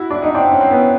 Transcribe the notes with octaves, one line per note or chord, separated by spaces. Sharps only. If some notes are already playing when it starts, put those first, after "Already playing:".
Already playing: E4 F#4
D4
D#4
C4 D4
C#4
C4
B3 C#4